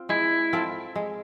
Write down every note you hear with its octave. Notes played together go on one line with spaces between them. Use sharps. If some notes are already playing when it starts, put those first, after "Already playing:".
Already playing: C4 F4
G#3 E4
C4 F4 A4
G#3